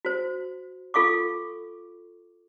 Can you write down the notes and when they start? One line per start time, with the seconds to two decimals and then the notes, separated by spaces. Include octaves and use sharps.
0.05 F#4 C5
0.94 F4 A4 F5 C#6 D6